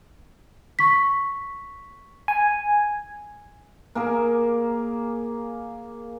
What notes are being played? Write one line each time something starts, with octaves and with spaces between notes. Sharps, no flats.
C#6 B6
G#5
A#3 G#4 A#4